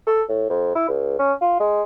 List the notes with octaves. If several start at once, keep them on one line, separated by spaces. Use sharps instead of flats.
A4
A2
F2
E4
C#2
C#4
F4
G#3